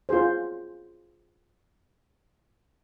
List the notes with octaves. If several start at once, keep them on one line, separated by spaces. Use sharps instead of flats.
F4 F#4 G#4 C5